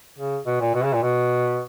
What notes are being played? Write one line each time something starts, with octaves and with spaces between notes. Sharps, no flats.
C#3
B2
A#2
B2
C#3
A#2
B2